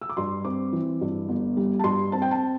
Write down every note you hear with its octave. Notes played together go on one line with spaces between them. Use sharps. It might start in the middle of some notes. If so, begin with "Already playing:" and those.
E6
D6
G2 C6
C4 D6
E3
G2
G1
G3
A5
G2 C6
C4 A5
G5
A5